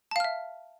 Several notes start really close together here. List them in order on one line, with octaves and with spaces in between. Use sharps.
A5 F5 F6 E5